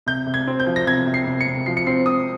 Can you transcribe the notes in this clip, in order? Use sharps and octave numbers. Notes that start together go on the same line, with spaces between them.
C3 G6
C3
G#6
C4
G6
F3
A#6
C3 G#6
C3
C7
C3
C#7
C3
F3 C7
C#7
C4 C7
C4 D#6